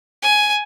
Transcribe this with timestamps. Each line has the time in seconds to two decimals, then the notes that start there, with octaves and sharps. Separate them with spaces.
0.22 G#5